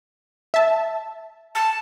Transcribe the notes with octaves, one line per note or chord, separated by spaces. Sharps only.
E5 A5
A5